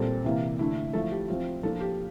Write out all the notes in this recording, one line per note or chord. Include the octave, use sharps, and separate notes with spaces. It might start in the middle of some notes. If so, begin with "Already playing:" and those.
Already playing: A#2 G3 C4 A4
C3 E3 A#3
D3 A3 E4
F3 A3 E4 A4
G4
F3 C4 F4
F3 A#3 D4 F4 A4
G4